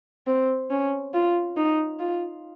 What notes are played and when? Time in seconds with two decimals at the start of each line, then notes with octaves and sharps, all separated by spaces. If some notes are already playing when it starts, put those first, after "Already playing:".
0.27 C4
0.70 C#4
1.14 F4
1.57 D#4
2.00 F4